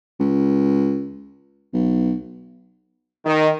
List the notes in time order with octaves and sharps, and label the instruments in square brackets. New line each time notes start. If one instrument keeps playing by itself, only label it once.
[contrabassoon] C#2
B1
[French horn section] D#3